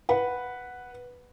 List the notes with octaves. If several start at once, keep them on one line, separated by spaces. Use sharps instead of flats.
B4 F#5